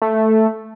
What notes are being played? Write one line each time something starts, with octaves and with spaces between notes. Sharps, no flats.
A3